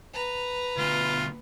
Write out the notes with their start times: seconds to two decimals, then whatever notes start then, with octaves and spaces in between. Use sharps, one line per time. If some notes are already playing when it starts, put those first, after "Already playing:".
0.13 B4 A#5
0.77 D2 B2 F4